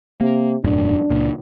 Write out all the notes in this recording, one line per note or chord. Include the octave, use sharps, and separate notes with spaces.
C3 A#3
E1 F#2 A2 D4
C#2 A#2